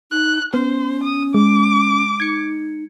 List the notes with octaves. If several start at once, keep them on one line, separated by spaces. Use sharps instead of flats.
D#4 F#6
B3 C#4 C5
D#6
G#3 D6
D#4 G#6 C#7